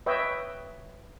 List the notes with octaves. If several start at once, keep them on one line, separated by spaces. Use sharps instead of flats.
B4 C#5 D#5 E5 G5